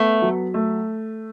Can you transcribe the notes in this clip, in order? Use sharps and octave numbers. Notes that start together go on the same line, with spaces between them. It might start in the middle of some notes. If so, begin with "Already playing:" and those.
Already playing: A3 B3
F#3
A3